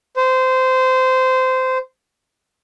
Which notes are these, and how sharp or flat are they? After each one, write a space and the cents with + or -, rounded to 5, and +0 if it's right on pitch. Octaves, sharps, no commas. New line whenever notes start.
C5 -20